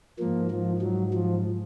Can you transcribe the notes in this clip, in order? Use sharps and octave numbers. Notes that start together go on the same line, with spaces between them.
G#2 F3 A#3
F3
F#3
F3